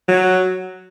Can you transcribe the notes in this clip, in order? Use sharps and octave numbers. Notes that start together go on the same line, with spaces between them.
F#3